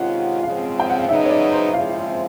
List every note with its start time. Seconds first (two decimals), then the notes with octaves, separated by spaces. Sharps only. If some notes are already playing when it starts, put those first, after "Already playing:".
Already playing: C3 D#3 G#3 C#4 F4 F#5
0.43 C#3 F3 G#3 C4 F5
0.80 G5
0.89 F#5
0.99 F5
1.08 C#3 F#3 B3 D#4 E5
1.25 C#5
1.29 D5
1.52 C5
1.74 C#3 F3 G#3 C4 E4 F5